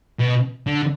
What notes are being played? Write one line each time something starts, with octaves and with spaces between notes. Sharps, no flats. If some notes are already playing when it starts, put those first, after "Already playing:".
B2
D3